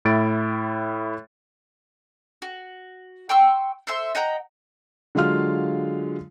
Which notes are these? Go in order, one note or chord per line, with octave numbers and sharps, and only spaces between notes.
A2 E4 A6 D7
F#4
G5 C6 C#6 E6
A4 C5 E5 C6
D#5 F#5 G5 A#5
D3 F#3 G#3 F4 F5 F6